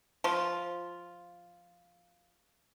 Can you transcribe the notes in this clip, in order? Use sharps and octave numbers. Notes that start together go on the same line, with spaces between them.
F3 F4